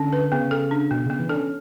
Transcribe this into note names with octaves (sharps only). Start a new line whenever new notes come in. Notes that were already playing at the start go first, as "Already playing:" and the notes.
Already playing: D3 C#4
B4
C#3 B3
A4
D4
B2 B3
C#3 B3
E3
D4 A4
C#4